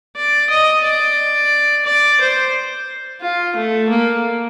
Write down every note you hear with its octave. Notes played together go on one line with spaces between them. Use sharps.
D5
D#5
D5
D5
C5
F4
A3
A#3